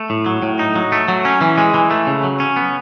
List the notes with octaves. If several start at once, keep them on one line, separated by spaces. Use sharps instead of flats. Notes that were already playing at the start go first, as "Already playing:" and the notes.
Already playing: A3
A2
F#3
A2
D#4
F#3
A3
F#3
C#4
E3
G#3
E3
A3
C#3
F#3
C#4
B3